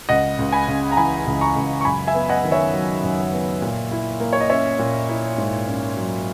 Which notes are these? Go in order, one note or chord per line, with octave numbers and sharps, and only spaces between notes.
C#2 D#5 F#5
C#2
G#5 B5
C#3
A#5
E3 G#5 B5
C#2
A#5 C#6
C#2
C#6
F#2 G#5 B5
E5 G#5
B3
D#5 F#5
D#3
C#5 E5
F#3
F#2
B3
A#2
E4
A#3
C#5
D#5
C#4 C#5 E5
A#2
E4
G#2
C#4
F#3